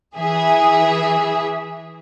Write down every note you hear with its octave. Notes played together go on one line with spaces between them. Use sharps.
E3 G#4 E5